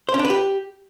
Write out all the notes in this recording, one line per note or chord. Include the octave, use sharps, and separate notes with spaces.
C5
C#4
D4
B4
G4